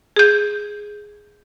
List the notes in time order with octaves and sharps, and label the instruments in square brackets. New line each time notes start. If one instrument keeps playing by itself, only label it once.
[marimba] G#4 G6